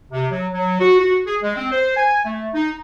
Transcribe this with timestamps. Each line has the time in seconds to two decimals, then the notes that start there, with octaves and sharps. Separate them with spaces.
0.12 C3
0.32 F#3
0.53 F#3
0.80 F#4
0.99 F#4
1.26 G#4
1.43 G#3
1.56 C4
1.71 C5
1.96 G#5
2.25 A3
2.54 D#4